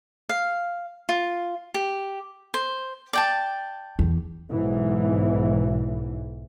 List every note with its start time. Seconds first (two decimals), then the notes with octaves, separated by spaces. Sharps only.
0.29 F5
1.09 F4
1.74 G4
2.54 C5
3.13 D5 G5 A5
3.99 E2
4.50 B1 G#2 E3